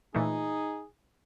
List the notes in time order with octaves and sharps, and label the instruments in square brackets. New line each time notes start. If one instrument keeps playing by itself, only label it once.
[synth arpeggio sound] A#2 E3 A3 [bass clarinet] D#4 [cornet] G#4